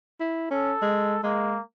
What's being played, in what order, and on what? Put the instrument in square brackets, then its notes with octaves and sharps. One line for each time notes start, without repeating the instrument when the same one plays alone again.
[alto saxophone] E4
[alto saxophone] C#4 [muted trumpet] A4
[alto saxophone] G#3
[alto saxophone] G#3 [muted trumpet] A#3